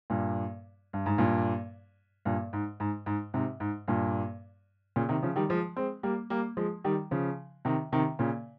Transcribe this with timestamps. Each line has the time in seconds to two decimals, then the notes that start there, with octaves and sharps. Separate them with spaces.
0.10 G2 A#2
0.93 G2
1.06 G#2
1.18 G2 A#2
2.25 G2 A#2
2.53 G#2
2.80 G#2
3.06 G#2
3.34 G#2 C3
3.60 G#2
3.88 G2 A#2
4.96 A#2 C#3
5.09 C3 D#3
5.22 C#3 F3
5.36 D#3 G3
5.49 F3 G#3
5.77 G#3 C4
6.03 G3 A#3
6.30 G3 A#3
6.57 F3 G#3
6.84 D#3 G3
7.11 C#3 F3
7.65 C3 D#3
7.92 C3 D#3
8.19 A#2 C#3